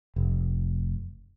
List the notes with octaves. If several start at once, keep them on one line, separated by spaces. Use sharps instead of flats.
F1